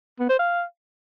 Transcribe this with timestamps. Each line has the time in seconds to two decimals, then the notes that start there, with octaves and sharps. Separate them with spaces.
0.19 B3
0.29 C5
0.39 F5